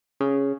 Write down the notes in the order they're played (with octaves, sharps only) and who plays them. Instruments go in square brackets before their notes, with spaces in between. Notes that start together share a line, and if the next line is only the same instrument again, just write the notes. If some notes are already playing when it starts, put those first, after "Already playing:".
[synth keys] C#3